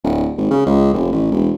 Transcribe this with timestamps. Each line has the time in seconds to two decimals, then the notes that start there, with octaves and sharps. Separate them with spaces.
0.04 D1
0.37 G#1
0.51 C#3
0.67 C#2
0.94 F1
1.12 A1
1.31 E1